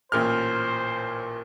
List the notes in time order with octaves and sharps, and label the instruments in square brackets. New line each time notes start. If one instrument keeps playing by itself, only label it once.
[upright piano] A1 A#2 F6 [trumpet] C5